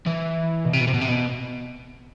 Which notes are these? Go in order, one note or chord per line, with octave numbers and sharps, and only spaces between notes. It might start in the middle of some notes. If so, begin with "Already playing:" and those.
E3
B2
C3
B2
C3
B2
C3
B2